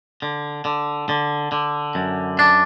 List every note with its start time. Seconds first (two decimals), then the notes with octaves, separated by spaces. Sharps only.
0.22 D3
0.65 D3
1.09 D3
1.52 D3
1.95 F#2
2.39 D4